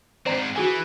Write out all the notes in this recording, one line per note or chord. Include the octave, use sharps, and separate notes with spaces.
G#2 C4 C5 D5 A#5
E3 F#4 G#4 G#5